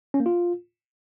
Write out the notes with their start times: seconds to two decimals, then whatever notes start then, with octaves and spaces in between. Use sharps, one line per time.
0.14 C#4
0.20 A#3
0.26 F4